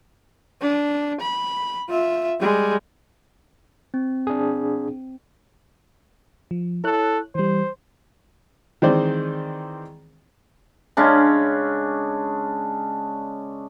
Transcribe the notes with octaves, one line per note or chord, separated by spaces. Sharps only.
D4
B5
F4 E5
G3 G#3
C4
D4 G#4
F3
E4 A4 C#5 F#6
E3 G3 C5
D#3 E3 G#3 C4 C5 D5
C#3 G#3 C#4 D4